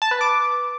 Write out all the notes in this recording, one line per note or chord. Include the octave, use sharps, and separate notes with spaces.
A5
B4
D6